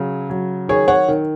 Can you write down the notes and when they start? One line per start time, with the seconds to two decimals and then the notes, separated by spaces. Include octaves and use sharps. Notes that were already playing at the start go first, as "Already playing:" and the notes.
Already playing: C#3 F#3
0.30 F#3
0.68 D#3 G#4 C#5
0.88 C#5 F#5
1.08 D#3